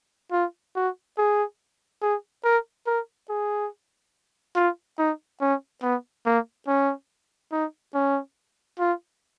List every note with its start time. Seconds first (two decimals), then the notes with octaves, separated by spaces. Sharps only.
0.32 F4
0.75 F#4
1.18 G#4
2.02 G#4
2.44 A#4
2.87 A#4
3.29 G#4
4.56 F4
4.98 D#4
5.41 C#4
5.82 B3
6.26 A#3
6.67 C#4
7.52 D#4
7.94 C#4
8.79 F4